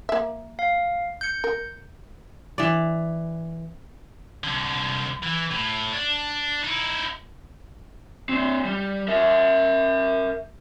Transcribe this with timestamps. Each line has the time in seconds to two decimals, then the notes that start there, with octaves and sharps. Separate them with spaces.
0.09 A#3 E5
0.59 F5
1.21 G6 C#7
1.44 A#4
2.58 E3 D5
4.44 C2 D3
5.23 E3
5.51 A2
5.92 D4
6.64 D#4 E4
8.29 C4 D4
8.65 G3
9.08 A#4 E5